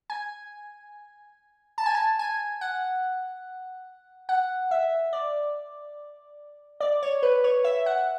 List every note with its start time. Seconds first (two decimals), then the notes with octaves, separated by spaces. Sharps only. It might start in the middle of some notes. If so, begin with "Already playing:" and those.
0.10 G#5
1.78 A5
1.86 G#5
1.95 A5
2.19 G#5
2.61 F#5
4.29 F#5
4.71 E5
5.13 D5
6.80 D5
7.03 C#5
7.23 B4
7.44 C#5
7.64 E5
7.86 F#5